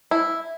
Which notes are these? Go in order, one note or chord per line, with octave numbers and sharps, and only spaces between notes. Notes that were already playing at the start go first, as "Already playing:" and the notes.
E4